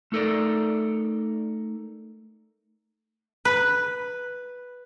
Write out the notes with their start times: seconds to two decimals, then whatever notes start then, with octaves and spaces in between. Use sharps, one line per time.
0.12 A3 D#4 A4 A#4 D5
3.45 B4